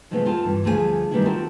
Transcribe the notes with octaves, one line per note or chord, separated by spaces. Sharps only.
C3 F3 G#3 A3 B3 C4
C4 F4 A4 A5
G2 E3
D2 F3 A3 G#4 A4 G#5
D#3 G3 A3 B3 C#4 E4
C4 F4 F#4 A4